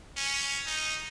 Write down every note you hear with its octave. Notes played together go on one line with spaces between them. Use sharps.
C#4
D#4